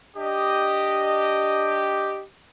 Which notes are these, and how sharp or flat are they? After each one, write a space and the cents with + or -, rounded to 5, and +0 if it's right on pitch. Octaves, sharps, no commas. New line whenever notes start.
D4 +0 G4 +0 D#5 -5